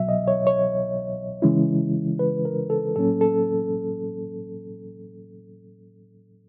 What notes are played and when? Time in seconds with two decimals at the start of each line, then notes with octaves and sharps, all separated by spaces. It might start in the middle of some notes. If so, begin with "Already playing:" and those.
Already playing: C2 B2 F#3 E5
0.09 D#5
0.28 C#5
0.47 C#5
1.42 C#3 E3 G#3 C#4 E4
2.19 B4
2.45 A#4
2.70 A4
2.96 A2 F#3 A#3 C#4 A4
3.21 A4